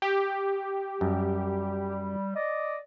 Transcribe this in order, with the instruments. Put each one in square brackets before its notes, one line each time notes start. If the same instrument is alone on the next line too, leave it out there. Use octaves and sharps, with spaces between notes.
[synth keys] G4
[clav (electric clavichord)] F#2 [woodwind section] G3
[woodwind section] D5 D#5